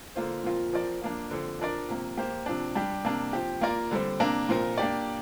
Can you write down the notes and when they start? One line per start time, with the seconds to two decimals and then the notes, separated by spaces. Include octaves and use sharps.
0.15 D3 A#3 F4 C5
0.43 A#2 F3 C4 F4 A#4
0.73 F3 C4 A#4 D5
1.02 F3 A#3 D4
1.31 D3 F3 C4
1.59 F3 D4 A#4 D5
1.88 C3 F3 A#3
2.17 A#3 G4 C5
2.46 C3 F3 D4
2.75 G3 D4 G4
3.05 C3 A#3 D4
3.33 F3 C4 G4
3.61 A#3 F4 A#4 D5
3.91 D3 G3 C4
4.20 C3 A#3 D4 A#4
4.49 A#2 F3 C4 F4 A#4
4.78 A#3 D4 G4 D5